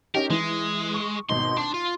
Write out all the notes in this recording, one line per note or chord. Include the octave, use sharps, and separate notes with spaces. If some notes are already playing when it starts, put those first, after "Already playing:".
C#4 D#4 G4 A#4
E3 G#3
C#6
G#1 B2 D#4 C6
D4 C6
F4